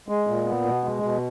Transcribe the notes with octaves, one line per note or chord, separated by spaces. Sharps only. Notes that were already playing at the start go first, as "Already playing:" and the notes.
G#3
A#2
B3
B2
G#3
B2